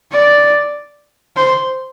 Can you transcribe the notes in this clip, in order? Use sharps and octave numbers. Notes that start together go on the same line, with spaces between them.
D5
C5